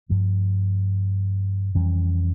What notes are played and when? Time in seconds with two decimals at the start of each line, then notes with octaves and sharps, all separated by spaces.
0.09 G2 F3 A3
1.75 F2 E3 G3 C#4